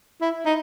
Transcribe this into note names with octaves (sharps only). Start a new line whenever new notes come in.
E4
D#4